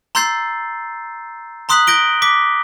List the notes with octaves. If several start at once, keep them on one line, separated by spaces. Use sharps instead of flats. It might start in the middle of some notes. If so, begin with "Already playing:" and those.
A#5 C6 E6 G6 A6 C7
A#5 C6 D#6 F#6 B6 F#7
G6 A#6 D7 G7
D6 B6